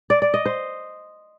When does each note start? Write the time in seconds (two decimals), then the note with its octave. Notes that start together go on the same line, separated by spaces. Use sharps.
0.10 D5
0.22 D5
0.34 D#5
0.46 C5